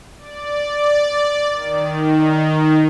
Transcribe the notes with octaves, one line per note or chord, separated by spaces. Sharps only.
D5
D#3